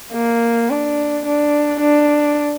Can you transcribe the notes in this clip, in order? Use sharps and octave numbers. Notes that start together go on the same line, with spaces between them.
A#3
D4
D4
D4